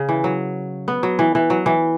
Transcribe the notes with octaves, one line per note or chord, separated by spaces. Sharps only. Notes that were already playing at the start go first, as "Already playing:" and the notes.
Already playing: C#3
E3
F#3
B3
F#3
E3
E3
F#3
E3